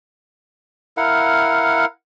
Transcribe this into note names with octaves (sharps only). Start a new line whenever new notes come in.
E4 A#4 F5 F#5